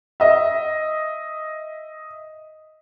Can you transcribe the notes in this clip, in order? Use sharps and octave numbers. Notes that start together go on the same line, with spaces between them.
D#5 E5